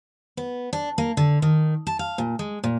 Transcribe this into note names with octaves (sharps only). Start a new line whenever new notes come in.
B3
D4
A#3
D3
D#3
A5
F5
A#2
G#3
A#2